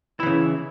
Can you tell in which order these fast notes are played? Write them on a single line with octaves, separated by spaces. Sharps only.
E4 E3 C#3